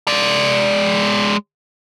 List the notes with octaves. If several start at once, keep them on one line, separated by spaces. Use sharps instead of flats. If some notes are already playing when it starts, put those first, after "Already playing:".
G#3 D5